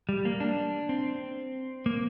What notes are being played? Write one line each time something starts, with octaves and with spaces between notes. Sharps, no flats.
G3
A#3
D4
C4
A#3